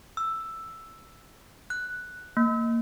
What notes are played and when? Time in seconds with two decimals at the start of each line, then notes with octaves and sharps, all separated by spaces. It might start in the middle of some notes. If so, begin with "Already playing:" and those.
0.17 E6
1.70 F#6
2.37 A#3